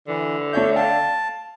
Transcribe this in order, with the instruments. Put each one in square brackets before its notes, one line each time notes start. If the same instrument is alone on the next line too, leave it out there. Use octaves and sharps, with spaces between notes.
[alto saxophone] D3 [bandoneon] E3
[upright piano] A3 C#5 E5 [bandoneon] G6
[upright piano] F5 G5 [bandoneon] A5